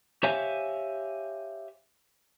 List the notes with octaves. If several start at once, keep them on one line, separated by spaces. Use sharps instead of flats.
G4 C5 C#5 E5 F5 G#5